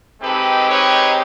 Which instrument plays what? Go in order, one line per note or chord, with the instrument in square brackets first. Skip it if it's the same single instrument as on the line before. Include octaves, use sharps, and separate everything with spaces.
[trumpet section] G#3 C4 D#4 G4 A4 B4
B4 C#5